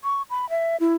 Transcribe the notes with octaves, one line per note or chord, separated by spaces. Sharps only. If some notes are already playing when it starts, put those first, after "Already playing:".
C#6
B5
E5
E4